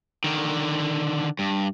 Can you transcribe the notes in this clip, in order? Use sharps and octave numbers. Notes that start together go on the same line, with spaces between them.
D3 D#3
G2